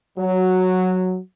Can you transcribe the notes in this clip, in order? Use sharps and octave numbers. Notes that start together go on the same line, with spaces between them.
F#3